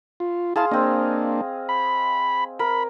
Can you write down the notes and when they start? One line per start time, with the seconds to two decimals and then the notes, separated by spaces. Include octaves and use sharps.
0.20 F4
0.56 E4 G#4 F5 A5 C6
0.71 A#3 C4 D4 D#5
1.69 B5
2.59 A#4 B5